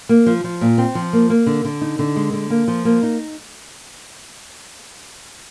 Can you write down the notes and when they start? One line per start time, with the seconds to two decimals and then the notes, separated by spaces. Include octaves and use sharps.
0.09 A#3
0.26 F3
0.44 F3
0.61 A#2
0.78 C4
0.95 F3
1.13 A#3
1.30 A#3
1.46 D3
1.65 D3
1.81 D#4
1.99 D3
2.16 G#3
2.33 D3
2.50 A#3
2.68 F3
2.85 A#3
3.03 D#4